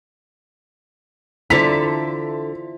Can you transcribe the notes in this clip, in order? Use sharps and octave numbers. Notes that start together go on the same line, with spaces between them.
D3 E4 F4 A4 C5 A#5 B6